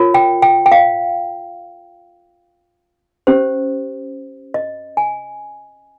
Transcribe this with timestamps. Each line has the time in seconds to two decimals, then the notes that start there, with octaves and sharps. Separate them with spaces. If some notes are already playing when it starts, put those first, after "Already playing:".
Already playing: F4 A#4 C#5
0.14 G5
0.42 G5
0.66 G5
0.72 F5
3.27 C#4 G4 C5
4.54 D#5
4.97 G#5